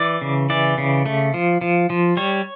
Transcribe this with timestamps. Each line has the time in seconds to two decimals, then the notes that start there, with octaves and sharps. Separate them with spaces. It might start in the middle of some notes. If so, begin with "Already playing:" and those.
Already playing: E3 D5
0.21 C#3
0.50 E3 D5
0.78 C#3
1.06 A3
1.34 F3
1.61 F3
1.90 F3
2.17 G3 C#5